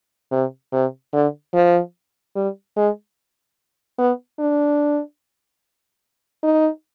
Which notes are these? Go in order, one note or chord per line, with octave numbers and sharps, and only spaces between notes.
C3
C3
D3
F3
G3
G#3
B3
D4
D#4